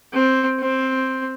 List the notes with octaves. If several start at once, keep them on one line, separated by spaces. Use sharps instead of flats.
C4
C4